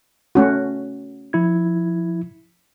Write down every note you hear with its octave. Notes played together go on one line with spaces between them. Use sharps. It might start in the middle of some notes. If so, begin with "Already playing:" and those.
A3 C#4 F#4
F3 E4 G#6